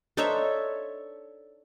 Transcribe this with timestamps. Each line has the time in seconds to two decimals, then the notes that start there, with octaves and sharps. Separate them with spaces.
0.17 D4 D#4 A4 C5 C#5 E5